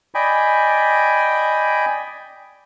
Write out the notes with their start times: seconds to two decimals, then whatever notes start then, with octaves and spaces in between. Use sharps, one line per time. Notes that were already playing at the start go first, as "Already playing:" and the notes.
0.15 D5 D#5 G5 G#5 B5